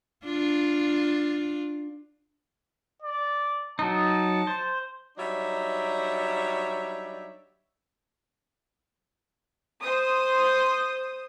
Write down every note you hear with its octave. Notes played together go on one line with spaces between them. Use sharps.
D4 F4
D5
F#3 D#4 A5
C5
F#3 G3 D4 D#4 C#5 E5
C5 D#6